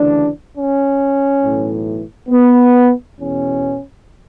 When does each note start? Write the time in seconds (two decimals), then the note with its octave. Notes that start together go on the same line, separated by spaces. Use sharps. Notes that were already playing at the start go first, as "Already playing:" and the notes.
Already playing: D2 C#3 E3 D4
0.54 C#4
1.42 B1 A2 E3
2.29 B3
3.17 E2 B2 C#4